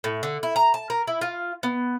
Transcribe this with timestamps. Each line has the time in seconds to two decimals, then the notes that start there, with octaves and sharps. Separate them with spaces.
0.04 A2
0.23 D3
0.43 E4
0.56 A#5
0.74 A5
0.90 A#4
1.07 E4
1.21 F4
1.63 B3